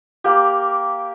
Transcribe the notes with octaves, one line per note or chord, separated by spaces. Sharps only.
A#3 G4